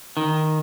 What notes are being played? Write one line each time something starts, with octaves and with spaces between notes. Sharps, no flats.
D#3